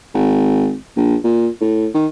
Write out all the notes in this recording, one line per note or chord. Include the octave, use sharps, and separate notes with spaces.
G#1
A#1
A#2
A2
D#3